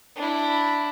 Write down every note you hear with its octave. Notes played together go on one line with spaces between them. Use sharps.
D4 E4